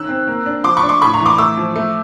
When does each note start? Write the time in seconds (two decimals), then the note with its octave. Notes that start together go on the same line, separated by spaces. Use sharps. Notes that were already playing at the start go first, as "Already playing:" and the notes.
Already playing: D#3 C#4 E6 F#6
0.09 C4
0.27 A#3
0.46 D4
0.64 F3 C6 D6
0.77 B5 C#6
0.83 D4
0.89 C6 D6
1.02 A2 B5 C#6
1.13 A#5 C6
1.20 E3
1.26 C6 D6
1.38 A3 D6 E6
1.57 F3
1.76 A3